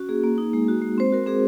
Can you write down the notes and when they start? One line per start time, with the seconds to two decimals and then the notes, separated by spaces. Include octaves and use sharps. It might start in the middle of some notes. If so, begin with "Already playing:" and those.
Already playing: C#4 F#4
0.09 A#3 G#4
0.23 A#3
0.38 D#4
0.53 G#3
0.68 F#4
0.82 G#3
0.98 C4 C5
1.12 F#4 A#4
1.26 C4 G#4